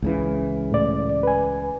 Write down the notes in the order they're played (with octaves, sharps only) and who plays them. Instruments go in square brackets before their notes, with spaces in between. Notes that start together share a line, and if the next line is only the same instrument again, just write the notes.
[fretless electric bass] C#2 C#3 E3
[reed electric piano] A2 D5
B4 G#5